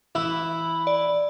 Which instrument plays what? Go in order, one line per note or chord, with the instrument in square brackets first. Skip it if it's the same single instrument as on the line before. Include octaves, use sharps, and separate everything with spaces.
[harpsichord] E3 E4 [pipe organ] B5
[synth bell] D5